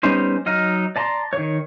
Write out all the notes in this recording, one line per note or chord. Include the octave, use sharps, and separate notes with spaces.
G3 B3 C#4 D#4 C5
F#3 D#4 D#5 F6
D5 A5 A#5 C6
D#3 C#5